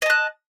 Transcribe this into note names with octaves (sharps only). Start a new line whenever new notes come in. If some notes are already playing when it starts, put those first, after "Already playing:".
D#5 A5 F#6